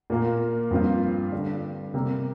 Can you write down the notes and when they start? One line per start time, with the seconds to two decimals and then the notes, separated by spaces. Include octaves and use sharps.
0.10 A#2 A#3 F4
0.71 G2 F3 C4 F4
1.32 D3 G3 D4
1.94 C3 G3 A#3